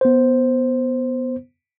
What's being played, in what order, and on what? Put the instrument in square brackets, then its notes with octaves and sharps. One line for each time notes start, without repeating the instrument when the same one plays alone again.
[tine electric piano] B3 C5